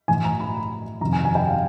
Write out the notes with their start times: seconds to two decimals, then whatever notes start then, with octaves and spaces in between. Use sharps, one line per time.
0.08 A2 E3 G#5
0.24 A#5
0.40 B5
1.01 F2 C3 D#3 A#5
1.13 G#5
1.25 G#5
1.35 G5
1.48 F5